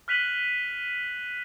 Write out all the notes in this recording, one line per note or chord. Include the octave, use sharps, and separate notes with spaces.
F6 F#6 B6 D#7 F7 F#7